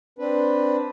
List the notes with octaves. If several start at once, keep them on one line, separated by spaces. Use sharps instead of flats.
C4 D4 B4